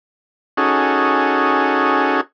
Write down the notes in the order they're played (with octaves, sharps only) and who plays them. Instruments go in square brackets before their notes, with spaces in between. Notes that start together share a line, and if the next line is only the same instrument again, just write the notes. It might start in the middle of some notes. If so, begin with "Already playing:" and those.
[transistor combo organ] C#4 D#4 F#4 G#4 A4